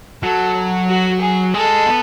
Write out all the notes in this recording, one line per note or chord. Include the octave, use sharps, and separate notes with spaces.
F#3 A4
F#4
G#4
G#3 A4
B3